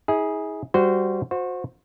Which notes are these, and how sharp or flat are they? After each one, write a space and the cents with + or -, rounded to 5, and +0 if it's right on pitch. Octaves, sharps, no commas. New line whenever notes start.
E4 -45 G#4 +0
G3 +0 F#4 +0 C5 -15
F#4 -30 C5 +0